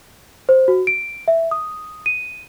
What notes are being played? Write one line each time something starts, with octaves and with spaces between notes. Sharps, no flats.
C5
F#4
D7
E5
D#6
D#7